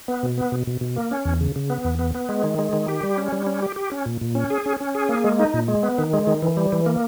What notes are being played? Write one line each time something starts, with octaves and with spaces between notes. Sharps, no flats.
B3
B2
B3
B2
B2
B2
A#3
C#4
E2
C#3
C#3
B3
E2
B3
B3
G#3
D#3
G#3
D#3
G4
G3
C#4
G3
C#4
G4
G4
C#4
A#2
A#2
C#4
G#4
C#4
C#4
G#4
A#3
G#3
D#4
A#2
G#3
B3
D#3
G#3
D#3
E3
G3
E3
A#3